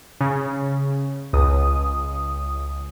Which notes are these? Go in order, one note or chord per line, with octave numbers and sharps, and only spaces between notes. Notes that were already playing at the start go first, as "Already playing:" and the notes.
C#3
C#2 D#6